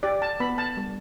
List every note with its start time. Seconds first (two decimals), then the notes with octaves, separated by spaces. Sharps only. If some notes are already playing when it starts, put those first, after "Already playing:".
0.03 G4 D5
0.22 A5
0.40 B3 B5
0.58 A5
0.77 G3